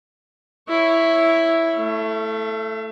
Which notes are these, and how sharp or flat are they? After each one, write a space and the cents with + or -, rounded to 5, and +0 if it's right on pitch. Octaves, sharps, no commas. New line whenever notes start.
E4 +0 C#5 +0
A3 +0 E5 +45